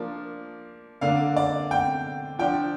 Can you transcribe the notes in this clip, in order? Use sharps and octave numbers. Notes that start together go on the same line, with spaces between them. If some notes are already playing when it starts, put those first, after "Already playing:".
Already playing: F3 A#3 D4
D3 A#3 D4 F5
D5
G5
F3 D4 G5